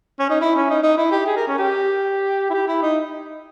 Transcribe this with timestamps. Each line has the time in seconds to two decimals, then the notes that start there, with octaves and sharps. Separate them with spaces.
0.19 C#4
0.29 D#4
0.41 E4
0.56 C#4
0.70 D#4
0.83 D#4
0.97 E4
1.12 G4
1.26 G#4
1.36 A#4
1.47 C#4
1.58 G4
2.50 E4
2.54 G4
2.67 E4
2.82 D#4